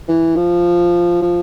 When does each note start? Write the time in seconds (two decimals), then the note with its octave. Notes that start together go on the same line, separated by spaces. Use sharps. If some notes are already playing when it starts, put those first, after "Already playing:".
0.08 E3
0.36 F3
1.22 F3